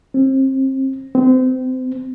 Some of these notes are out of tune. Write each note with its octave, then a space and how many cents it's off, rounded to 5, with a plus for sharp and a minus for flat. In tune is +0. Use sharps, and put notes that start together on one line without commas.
C4 +30
C4 -30